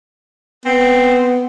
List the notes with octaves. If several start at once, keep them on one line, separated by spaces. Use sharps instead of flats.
B3 C4